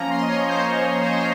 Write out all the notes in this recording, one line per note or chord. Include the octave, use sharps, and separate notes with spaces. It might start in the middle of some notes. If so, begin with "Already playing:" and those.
Already playing: F3 A#3 C#4 A#5
C6
D#5
C#5
C5
C#5
C5
C#5
C5
C#5
C5
C#5
C5